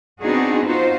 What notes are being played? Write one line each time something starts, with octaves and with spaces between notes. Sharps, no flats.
B3 C4 D4 D#4 F#4 G#4
D#4 F4 F#4 C5